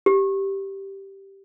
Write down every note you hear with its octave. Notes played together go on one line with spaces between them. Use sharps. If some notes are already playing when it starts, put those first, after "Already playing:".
G4